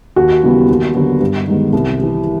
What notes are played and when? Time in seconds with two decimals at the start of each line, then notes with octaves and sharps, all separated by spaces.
0.16 D#2 F#4
0.43 C#3 E3 G3 B3
0.69 D#2
0.94 D3 F#3 B3
1.20 G2
1.47 D#3 G#3 B3
1.73 C2
1.99 C3 E3